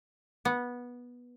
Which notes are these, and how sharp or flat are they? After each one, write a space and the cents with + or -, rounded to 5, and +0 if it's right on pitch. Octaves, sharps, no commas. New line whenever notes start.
B3 -15